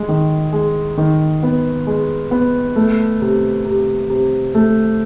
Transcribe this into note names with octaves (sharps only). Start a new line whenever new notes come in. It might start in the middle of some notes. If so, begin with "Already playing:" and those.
Already playing: G#3
D#3
G#3
D#3
B3
G#3
B3
A3
C3
C3
C3
A3